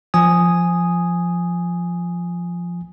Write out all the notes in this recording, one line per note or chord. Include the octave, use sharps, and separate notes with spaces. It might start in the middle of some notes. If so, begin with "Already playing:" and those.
F3 G#5 D#6